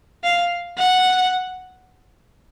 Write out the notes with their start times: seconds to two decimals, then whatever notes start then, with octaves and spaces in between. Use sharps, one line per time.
0.24 F5
0.78 F#5